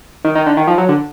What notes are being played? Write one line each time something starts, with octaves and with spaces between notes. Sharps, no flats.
D#3
D#3
D3
D#3
F3
F#3
D3